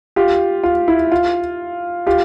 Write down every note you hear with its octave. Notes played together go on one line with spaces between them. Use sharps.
F4 G4
F4
E4
F4
F4 G4